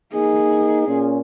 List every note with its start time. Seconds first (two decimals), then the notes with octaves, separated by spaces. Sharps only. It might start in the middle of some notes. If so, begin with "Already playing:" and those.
0.14 A#3 D#4 G#4
0.87 A#2 C#4